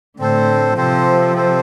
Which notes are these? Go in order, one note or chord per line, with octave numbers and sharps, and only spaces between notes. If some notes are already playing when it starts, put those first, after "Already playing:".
A2 D3 C4 A4 C5
C3 F3 C4 A4 C5
C4 A4 C5